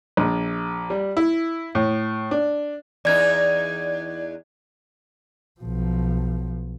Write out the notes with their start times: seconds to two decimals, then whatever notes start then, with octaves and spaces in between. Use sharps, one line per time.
0.17 A#1
0.90 G3
1.17 E4
1.75 A2
2.31 D4
3.05 E2 D#4 D5 G#6
5.61 B1 F3